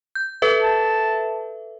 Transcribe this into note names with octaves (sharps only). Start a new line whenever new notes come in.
G6
A4 B4 E5
A5